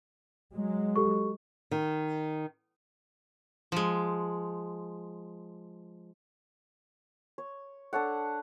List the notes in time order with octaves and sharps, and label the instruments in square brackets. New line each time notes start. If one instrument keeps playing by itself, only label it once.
[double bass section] F#3 G#3
[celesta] G4 A4 C#6
[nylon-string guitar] D#3
[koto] F3 G#3
[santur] C#5
D4 A4 C#5 F#5